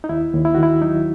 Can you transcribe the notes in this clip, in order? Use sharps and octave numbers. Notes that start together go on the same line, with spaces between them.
D#4
D#2 E4
D#2
E4
D#3 F#4
E4
F#3 D#4